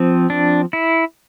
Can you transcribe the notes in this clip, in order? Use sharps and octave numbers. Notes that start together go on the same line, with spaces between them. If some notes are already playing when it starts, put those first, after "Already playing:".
Already playing: F3 C4
D4
E4